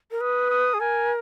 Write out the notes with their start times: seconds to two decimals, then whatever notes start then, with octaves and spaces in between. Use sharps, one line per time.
0.11 A#4
0.21 B4 D#6
0.51 D#6
0.74 G#4
0.80 A#4 G#5